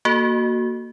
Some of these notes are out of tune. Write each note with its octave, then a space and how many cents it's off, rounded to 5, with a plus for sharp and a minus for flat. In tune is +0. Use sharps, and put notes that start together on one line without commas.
A#3 +0 F#4 +0 A4 +0